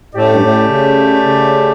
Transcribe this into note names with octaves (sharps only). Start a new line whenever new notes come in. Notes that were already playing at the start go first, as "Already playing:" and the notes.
A2 A3 C#4 G4 D5
G2
A2
C#3
C#3